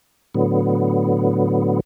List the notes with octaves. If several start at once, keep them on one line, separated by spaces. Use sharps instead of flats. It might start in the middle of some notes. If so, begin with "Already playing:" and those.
A2 D3 F#3 B3